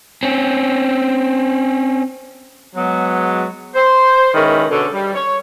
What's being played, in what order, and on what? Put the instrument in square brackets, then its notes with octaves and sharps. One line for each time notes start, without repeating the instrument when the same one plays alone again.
[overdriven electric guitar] C4 C#4
[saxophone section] F#3 G#3 B3
C5
D#3 G#3 C#4 E4 A#4 B4
B2 D3 C#4 D4 A4
G3
C#5